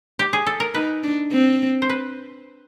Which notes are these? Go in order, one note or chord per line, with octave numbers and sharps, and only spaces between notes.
G4
G#4
A4
A#4
D#4 B4
D4
C4
C5
B4